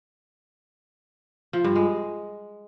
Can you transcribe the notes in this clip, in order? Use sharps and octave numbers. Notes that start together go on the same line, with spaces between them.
F3
G2
G#3